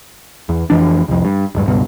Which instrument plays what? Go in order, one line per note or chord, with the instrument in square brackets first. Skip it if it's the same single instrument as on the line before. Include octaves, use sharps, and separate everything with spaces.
[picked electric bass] E2
F2 E3 D4
C2 F2
G2
D1 G2
C#2 G2 B2